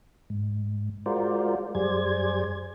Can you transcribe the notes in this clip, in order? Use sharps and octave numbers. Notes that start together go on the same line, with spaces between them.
G#2
G#3 F4 F#4 A#4 C5 D5
F#2 G3 G#4 C5 D5 G#6